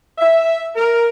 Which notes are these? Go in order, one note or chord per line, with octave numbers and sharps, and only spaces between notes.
E5
A#4